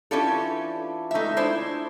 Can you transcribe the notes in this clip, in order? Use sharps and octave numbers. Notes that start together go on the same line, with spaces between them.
E3 C#4 D4 F4 G4 A4
G#3 A3 D#4 E5
D4 E4 C5